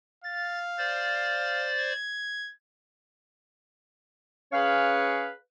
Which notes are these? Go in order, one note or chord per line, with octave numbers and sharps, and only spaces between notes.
F5 A6
C5 D5 A6
G#6
C#4 G#4 B4 C#5 F5